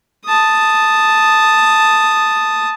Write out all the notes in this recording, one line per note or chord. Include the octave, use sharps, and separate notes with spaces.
A5 D#6